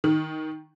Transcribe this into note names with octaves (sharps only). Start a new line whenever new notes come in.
D#3